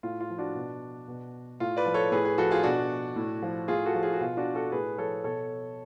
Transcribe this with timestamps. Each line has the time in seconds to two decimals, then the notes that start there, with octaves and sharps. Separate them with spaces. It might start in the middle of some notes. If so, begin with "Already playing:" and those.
0.03 A2 F4
0.20 F4
0.30 F3
0.38 D4 F#4
0.55 B2
1.08 B2
1.60 A2 F4
1.77 B4 D5
1.86 F3
1.94 A4 C#5
2.12 A2 G#4 B4
2.25 G#4 B4
2.38 F3 F#4 A4
2.51 F4 G#4
2.63 B2 D4 F#4
3.16 A2
3.42 F3
3.68 A2 F4 G#4
3.85 F#4 A4
3.94 F3
4.03 F4 G#4
4.13 F#4
4.20 B2 F4
4.37 D4 F#4
4.54 F#4 A4
4.72 A2 G#4 B4
4.98 F3 A4 C#5
5.24 B2 A4 C#5